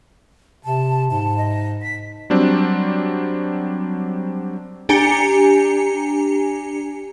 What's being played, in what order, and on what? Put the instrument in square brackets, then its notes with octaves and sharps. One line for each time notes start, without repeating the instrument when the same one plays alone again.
[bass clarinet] C3 [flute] A5
[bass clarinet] G#2 [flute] A5
[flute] D#5
B6
[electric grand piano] F#3 G3 C4 D4
[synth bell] D4 G4 G#5 A#5 C#7